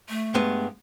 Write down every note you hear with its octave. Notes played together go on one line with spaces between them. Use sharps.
A3
G2 G#3 B3